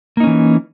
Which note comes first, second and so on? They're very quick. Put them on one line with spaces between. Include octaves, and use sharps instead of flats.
A#3 D#4 C#4 E3